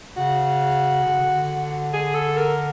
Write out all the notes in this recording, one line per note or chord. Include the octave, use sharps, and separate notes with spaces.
C#3 F#4
D3
C#3
D3
G#4
A4
A#4